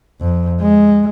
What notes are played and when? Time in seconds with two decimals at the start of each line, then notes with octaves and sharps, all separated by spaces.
0.20 F2
0.60 G#3